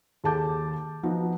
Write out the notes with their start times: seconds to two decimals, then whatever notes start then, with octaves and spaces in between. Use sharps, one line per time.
0.24 D#2 G#4 A4 A5 D6 G6
1.03 F3 B3 D#4 F#4